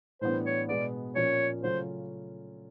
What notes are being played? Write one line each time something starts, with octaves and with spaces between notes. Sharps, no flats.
A2 E3 G3 B3 D4 C5
C#5
B2 G#3 B3 D5
A#2 F3 A#3 C#4 C#5
C#3 F#3 A3 C#4 F4 C5